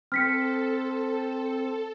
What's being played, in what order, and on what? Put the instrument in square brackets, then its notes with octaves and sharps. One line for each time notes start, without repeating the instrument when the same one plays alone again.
[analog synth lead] C4 [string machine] A4 [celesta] F6 B6 C#7